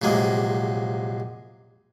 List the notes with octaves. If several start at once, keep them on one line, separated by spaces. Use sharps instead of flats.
A#1 F#2 C3 G#3 A#3